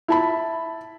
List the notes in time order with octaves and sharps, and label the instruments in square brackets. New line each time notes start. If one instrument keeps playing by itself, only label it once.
[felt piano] E4 A5 B5